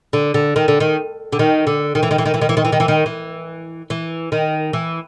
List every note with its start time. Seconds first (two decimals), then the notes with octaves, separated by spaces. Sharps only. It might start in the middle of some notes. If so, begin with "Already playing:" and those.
0.13 D3
0.34 D3
0.56 D#3
0.68 D3
0.80 D#3
1.32 D3
1.39 D#3
1.67 D3
1.95 D#3
2.03 E3
2.11 D#3
2.18 E3
2.26 D#3
2.34 E3
2.41 D#3
2.49 E3
2.57 D#3
2.65 E3
2.72 D#3
2.80 E3
2.88 D#3
3.06 E3
3.90 E3
4.32 D#3
4.73 E3